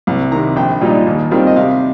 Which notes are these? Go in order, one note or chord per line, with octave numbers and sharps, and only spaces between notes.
C2
C3 D#3 A#5
A#1 G5
A#2 G3 D#4
D#2
D#3 G3 C4 F4
D#5
C3 F5